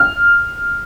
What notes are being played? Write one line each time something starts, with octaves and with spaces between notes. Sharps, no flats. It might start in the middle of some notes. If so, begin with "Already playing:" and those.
Already playing: F6